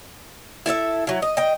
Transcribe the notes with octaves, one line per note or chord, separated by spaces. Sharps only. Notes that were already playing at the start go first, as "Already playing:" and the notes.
E4 A4 C#5 E5
F#3 E4
D#5
D#5 G5